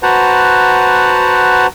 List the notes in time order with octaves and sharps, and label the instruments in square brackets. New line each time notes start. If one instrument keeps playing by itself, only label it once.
[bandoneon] F#4 B4 C5 F#5 A5 A#5